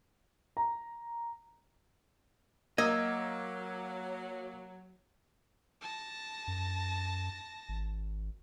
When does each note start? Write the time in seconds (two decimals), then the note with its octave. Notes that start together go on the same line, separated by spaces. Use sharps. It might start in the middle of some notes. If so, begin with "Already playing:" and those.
0.57 A#5
2.78 F#3 A#3 D#5 E6 G#6
5.81 A5 A#6
6.47 F#2
7.69 G#1